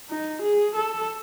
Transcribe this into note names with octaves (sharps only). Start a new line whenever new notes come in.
D#4
G#4
A4